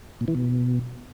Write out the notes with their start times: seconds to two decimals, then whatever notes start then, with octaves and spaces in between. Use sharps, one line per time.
0.21 A#2
0.28 E3
0.35 B2